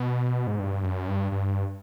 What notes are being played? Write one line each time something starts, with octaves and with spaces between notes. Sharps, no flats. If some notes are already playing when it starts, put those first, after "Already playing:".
Already playing: B2
G#2
G2
F#2
G2
G2